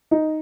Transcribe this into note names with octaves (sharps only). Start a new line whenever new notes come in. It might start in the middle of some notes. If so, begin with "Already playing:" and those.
D#4